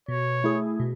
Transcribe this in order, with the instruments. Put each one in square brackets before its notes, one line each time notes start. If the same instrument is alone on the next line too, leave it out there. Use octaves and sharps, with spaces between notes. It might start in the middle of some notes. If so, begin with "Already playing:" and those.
[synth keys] B2 [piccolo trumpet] C#5
[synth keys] A3 E4 G#4
B2